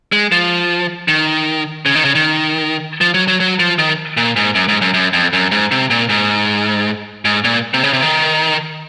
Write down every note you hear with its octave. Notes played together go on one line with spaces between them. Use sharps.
G#3
F3
D#3
C#3
D#3
C#3
D#3
F3
F#3
F#3
F#3
F3
D#3
A#2
G#2
F#2
G#2
F#2
F#2
F2
F#2
G#2
C3
A#2
G#2
G#2
A#2
C3
C#3
C3
D#3